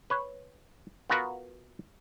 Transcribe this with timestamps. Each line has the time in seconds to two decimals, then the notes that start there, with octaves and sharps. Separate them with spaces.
0.10 B4 C#5
1.10 B3 F4 F#4 A#4 B4